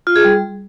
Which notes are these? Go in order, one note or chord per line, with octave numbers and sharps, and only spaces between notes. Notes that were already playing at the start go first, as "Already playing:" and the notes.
F4
G#4
G3